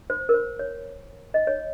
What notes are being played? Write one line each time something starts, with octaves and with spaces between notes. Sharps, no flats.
C5
A#4
C5
C#5
D#5
C#5